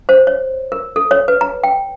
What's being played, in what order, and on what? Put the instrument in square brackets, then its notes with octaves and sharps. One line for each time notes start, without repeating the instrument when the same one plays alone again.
[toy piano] C5
C#5
A#4
A4
C#5
B4
A#5
G5